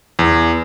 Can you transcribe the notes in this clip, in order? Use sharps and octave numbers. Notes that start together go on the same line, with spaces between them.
E2